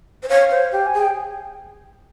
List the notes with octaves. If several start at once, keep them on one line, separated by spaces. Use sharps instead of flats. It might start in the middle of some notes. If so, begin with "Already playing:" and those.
C5
C#5 F5
C5
G4 G5
G#5
G#4
G5